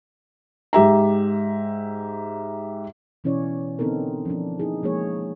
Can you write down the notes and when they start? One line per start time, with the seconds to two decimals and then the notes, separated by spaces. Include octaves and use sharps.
0.73 G#2 G4 E5 A#5
3.24 B2 E3 C#4 E4 C#5 D5
3.79 D3 B3 C4 D#4 A4 A#4
4.25 F3 C#4 D4
4.59 A#3 D#4 E4 G#4
4.83 F3 G#3 A#3 D#4 G#4 C#5